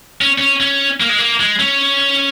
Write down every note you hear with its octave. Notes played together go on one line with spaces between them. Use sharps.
C#4
C#4
C#4
A#3
G#3
A#3
G#3
C#4